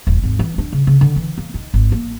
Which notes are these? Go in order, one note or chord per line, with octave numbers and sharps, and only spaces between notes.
D#1
G#1
E3
D4
C#3
C#3
D3
E3
A#3
D#3
G#1
A#3